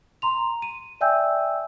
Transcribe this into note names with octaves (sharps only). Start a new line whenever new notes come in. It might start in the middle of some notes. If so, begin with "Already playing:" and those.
A#5 C6 F7
D#7
D5 E5 G5 G#5 E6 G6